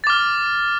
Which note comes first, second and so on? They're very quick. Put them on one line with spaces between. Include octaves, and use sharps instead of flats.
A6 D6 F6